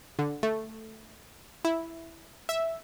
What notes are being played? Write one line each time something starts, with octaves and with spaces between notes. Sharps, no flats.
D3
A3
E4
E5